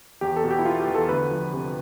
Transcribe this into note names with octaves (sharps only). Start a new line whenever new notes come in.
E2 G4
A4
B2
G4
E4
B3 F4
G4
E2
A4
D2 B4
F3
C3